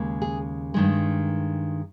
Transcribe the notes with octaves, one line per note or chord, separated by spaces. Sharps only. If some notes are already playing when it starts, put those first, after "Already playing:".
Already playing: D#2 C#3 G#3
G#4
G2 D#3 G#3